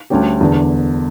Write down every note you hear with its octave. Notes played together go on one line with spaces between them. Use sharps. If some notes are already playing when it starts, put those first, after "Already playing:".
D2 D3 G3 C#4 G4
E1 E2 D3